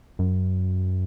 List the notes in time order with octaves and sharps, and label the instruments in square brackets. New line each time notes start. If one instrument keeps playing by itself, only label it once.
[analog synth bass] F#2